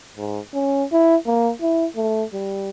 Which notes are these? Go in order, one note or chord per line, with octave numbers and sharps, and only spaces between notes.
G#2
C#4
E4
A#3
E4
A3
G3